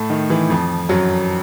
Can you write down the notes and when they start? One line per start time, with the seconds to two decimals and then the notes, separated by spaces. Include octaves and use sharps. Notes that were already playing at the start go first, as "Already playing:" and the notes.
Already playing: A2 A3
0.10 D#3
0.30 E3
0.49 F2 F3
0.89 F#2 F#3